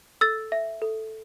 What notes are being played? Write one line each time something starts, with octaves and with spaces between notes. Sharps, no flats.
A4 E6 A6
E5
A4